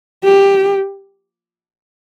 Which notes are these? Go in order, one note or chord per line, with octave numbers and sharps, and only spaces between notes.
G4